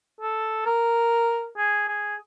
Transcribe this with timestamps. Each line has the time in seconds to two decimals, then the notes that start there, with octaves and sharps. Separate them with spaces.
0.21 A4
0.66 A#4
1.57 G#4
1.88 G#4